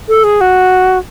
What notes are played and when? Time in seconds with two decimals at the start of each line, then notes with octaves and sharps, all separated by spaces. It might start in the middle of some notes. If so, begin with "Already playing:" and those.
0.08 A4
0.24 G#4
0.41 F#4